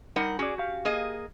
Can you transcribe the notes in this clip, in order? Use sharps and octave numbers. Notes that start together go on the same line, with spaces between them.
G3 D#4 A#4 F#5
C#4 F#4 G#4 D5
G4 F5
A#3 G#4 D#5